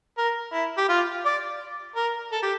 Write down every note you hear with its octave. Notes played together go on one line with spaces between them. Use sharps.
A#4
E4
G4
F4
D5
A#4
A4
G4